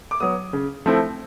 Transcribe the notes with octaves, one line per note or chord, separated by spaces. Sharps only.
D6
F#3 B3 D#6
C#3
F3 A3 C4 E4